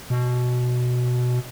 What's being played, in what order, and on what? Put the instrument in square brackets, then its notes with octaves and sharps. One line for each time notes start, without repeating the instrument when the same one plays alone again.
[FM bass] B2